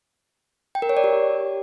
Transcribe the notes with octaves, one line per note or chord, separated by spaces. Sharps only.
G5
A#4
C#5
D5
G4